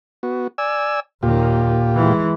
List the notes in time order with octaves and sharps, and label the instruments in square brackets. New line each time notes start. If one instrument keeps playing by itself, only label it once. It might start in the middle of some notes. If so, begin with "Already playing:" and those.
[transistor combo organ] B3 F#4
D5 G#5 E6
[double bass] D#2 D#3 [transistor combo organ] A#2 F4 G4
[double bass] E3 G#3